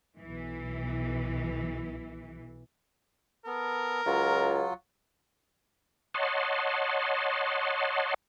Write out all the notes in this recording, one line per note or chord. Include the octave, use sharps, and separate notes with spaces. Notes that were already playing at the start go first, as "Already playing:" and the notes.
B1 E3
B3 A4 A#4
C#2 F#3 F4
C#5 D#5 F#5 A5 C6